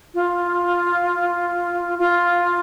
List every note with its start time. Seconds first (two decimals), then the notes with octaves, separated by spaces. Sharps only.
0.14 F4
1.99 F4